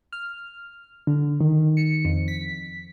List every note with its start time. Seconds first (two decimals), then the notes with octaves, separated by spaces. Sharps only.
0.13 F6
1.07 D3
1.41 D#3
1.77 C#7
2.05 F2
2.28 B6